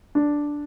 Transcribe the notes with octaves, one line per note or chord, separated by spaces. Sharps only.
D4